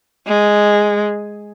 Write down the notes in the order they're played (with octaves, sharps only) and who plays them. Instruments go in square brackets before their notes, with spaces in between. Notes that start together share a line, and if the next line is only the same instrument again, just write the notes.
[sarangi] G#3